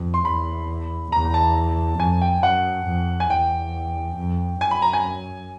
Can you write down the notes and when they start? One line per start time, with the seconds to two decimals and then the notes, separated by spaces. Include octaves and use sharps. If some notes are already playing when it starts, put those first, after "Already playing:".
Already playing: F2
0.14 C6
0.25 E2 B5
1.12 E2 A#5
1.34 A5
2.00 F2 G#5
2.22 G5
2.43 F#2 F#5
2.87 F2
3.20 G#5
3.30 E2 G5
4.17 F2
4.61 F#2 G#5
4.71 B5
4.82 A#5
4.93 G#5